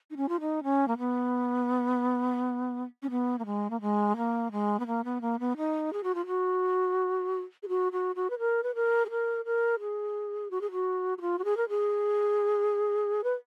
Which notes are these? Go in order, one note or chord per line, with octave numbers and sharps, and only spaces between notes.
D#4
C#4
F4
D#4
C#4
A#3
B3
C#4
B3
A#3
G#3
A#3
G#3
A#3
G#3
B3
A#3
B3
A#3
B3
D#4
G#4
F#4
F4
F#4
G#4
F#4
F#4
F#4
B4
A#4
B4
A#4
G#4
A#4
A#4
G#4
F#4
G#4
F#4
F#4
F4
F#4
G#4
A#4
G#4
B4